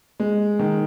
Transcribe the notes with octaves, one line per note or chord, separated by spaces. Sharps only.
G#3
D#3